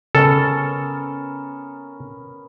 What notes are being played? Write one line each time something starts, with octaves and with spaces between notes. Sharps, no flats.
C#3 B3 C#4 A4 A#4